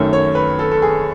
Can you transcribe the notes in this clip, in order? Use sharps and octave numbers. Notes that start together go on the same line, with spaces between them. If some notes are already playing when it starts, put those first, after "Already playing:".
Already playing: F#2 D#3 A3 C#4
C#5
B4
A4
A4
G#4